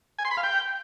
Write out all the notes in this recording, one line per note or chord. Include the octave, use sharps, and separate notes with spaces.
G#5
C6
B5
F5
G5